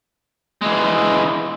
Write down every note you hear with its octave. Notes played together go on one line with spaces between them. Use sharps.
E3 G#3